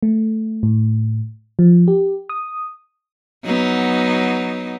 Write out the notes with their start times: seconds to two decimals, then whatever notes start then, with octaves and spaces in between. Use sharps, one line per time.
0.03 A3
0.63 A2
1.59 F3
1.88 G4
2.29 D#6
3.46 F#3 B3 D#4